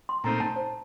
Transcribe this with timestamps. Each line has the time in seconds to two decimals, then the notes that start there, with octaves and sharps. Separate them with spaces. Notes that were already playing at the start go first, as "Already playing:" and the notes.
0.09 C6
0.24 A#2 A3 C4 D#4 A#5
0.40 A5
0.56 C5